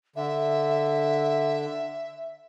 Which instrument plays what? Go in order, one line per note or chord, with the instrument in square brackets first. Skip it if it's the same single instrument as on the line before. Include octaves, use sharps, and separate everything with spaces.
[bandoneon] D3 [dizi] E5